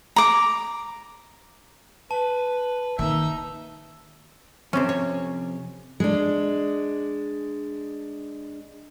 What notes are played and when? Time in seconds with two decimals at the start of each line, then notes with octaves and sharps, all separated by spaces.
0.16 A#5 D6
2.11 B4 A5
2.99 D#3 A#3 D#4 E5
4.73 F2 C3 C4 C#4
4.89 C#5
6.00 G#3 D4